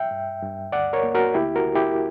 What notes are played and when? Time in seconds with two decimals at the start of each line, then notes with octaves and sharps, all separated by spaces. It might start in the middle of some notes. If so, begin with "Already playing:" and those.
Already playing: E5 G5
0.11 G2
0.42 G2
0.72 D2 D5 F#5
0.93 A#4 C#5
1.03 A#3
1.15 F#4 A#4
1.34 D2 E4 G4
1.56 F#4 A#4
1.66 D2
1.75 E4 G4